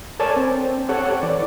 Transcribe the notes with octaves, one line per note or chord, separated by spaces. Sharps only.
A4 A#4 C#5 D5 G#5 A5
C4
G4 A4 C#5 F#5
E3 D5